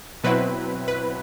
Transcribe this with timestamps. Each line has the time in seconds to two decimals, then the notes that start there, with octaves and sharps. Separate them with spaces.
0.24 B2 F#3 C4 E4 B4
0.88 B4